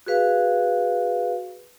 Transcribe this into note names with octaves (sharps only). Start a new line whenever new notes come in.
F#4 G#4 B4 F5